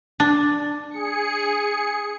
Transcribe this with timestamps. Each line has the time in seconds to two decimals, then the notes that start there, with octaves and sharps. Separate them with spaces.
0.20 D4
0.91 G#4 C#7